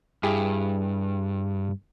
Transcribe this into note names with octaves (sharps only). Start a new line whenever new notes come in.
G2 E4 G4 G#4